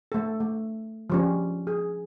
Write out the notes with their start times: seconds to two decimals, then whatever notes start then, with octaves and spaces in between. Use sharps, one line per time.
0.12 A3 A4
0.40 A3
1.10 F3 G3 C#4
1.67 G#4